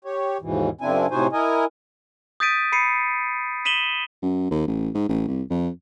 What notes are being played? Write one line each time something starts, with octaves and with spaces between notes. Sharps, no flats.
G4 C#5
D#2 G#2 B2 E3
F#2 C#3 C4 D4 E4 G#5
A2 C3 D#4 F#4 C5 G#5
E4 A#4 D#5 G#5
D#6 G6 A6 B6 D7 D#7
B5 C7 C#7 D#7
B6 D#7 E7 F#7 G7
F#2
D#2
A1
G#2
A1
C2
F2